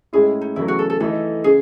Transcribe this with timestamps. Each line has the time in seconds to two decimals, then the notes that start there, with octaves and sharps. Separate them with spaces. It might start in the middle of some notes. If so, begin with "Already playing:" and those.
0.13 A2 G#3 C#4 E4 G#4
0.41 D#4
0.56 E2 C#3 F#3 A3 E4
0.68 F#4
0.79 A4
0.90 A4
1.00 E3 A3 D#4 A4
1.44 C#3 G#4